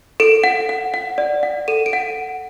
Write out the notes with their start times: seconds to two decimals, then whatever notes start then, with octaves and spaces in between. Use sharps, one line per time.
0.20 A4 D7
0.44 F#5
0.69 F#5
0.94 F#5
1.18 D5
1.43 F#5
1.68 A4 D#7
1.86 D7
1.93 F#5